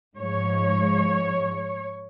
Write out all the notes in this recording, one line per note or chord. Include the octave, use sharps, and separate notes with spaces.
G#2 F3 G#3 C#5